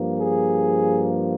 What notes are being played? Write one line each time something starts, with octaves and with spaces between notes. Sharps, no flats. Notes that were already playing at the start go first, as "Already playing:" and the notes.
Already playing: G2 F3 A#3
G#4